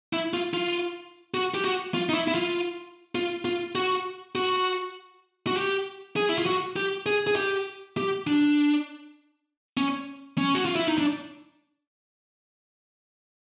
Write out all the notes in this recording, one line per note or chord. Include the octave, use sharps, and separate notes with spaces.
E4
F4
F4
F#4
G4
F#4
F4
D#4
E4
E4
F4
F4
F4
F#4
F#4
F#4
G4
G#4
E4
F4
F#4
G4
G#4
G#4
G4
G4
D4
C#4
C#4
F#4
F4
E4
D#4
D4